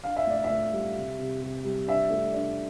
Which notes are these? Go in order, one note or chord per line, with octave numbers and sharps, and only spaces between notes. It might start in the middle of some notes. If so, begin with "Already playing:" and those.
D4 F5
E5
A2 D5
E5
A2
G3
C3
C3
C3
G3
D4 E5
A3
D4